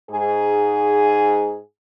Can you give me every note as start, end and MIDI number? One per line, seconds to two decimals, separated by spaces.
0.11 1.58 44
0.11 1.58 68